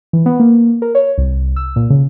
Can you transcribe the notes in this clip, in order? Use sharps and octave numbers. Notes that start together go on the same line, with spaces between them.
E3
B3
A#3
A#4
C#5
C2
E6
A#2
C#3